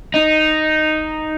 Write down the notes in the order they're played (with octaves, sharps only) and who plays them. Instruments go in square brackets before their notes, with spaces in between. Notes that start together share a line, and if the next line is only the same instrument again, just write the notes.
[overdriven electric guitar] D#4